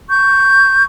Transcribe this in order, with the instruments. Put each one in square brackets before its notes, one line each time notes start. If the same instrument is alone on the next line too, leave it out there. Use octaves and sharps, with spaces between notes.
[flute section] C#6 G6